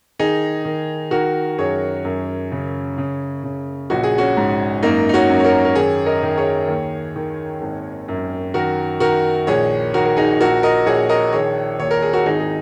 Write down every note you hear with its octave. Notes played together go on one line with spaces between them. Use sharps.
D#3 D#4 G#4
D#3
D#3 F#4 A#4
F#2 G#4 C#5
F#2
C#3
C#3
C#3
A#1 F#4
G#4
C#4 F#4
G#2
F#2 A#3 D#4
D#4
C#4 F#4
F#2
C#5
F#4 A#4
A#4
D#3 G#4 C#5
A#4 D#5
D#3
G#4 C#5
D#2
D#3
G#1
F#2
D#3 F#4 A#4
D#3 F#4 A#4
A#1 G#4 C#5
D#3 F#4 A#4
A#4
D#4 G#4
A#1 F#4 A#4
A#4 D#5
A#1 G#4 C#5
A#4 D#5
D#3 G#4 C#5
D#2 C#5
A#4
G#4
F#4 A#4
G#1 D#4 G#4
G#4